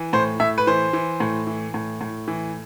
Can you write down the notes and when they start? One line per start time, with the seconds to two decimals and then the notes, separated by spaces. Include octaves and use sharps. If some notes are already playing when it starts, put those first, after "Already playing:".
Already playing: E3
0.13 A2 C5
0.40 A2 E5
0.58 B4
0.67 E3 C5
0.93 E3
1.20 A2
1.47 E3
1.74 A2
2.01 A2
2.28 E3